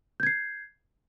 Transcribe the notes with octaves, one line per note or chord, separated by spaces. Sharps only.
G6 G#6 C7